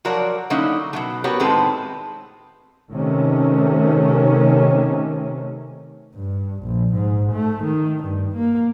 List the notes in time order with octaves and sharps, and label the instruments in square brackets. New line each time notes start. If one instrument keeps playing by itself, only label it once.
[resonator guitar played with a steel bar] F3 F#3 F#4 A#4 C#5 D5
D3 F#3 A#3 C#4 D#4 E4
B2 F#3 A3
B3 F#4 G4 A#4 B4 C#5
A2 D#3 G#3 C4 A4 B4
[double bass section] C3 D#3 A3 C#4
[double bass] G2
A#1
G#2
A3
D#3
G2
A#3